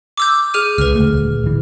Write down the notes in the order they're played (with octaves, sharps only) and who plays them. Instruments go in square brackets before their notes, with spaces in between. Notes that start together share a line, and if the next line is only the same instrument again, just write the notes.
[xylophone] D6 E6 G6
G#4 F6 D#7
[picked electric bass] C#2 [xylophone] B4 F6
[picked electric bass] D#1 D2 A3
D1 E3